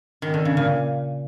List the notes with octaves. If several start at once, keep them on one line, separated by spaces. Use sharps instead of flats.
D#3
D3
C#3
A#2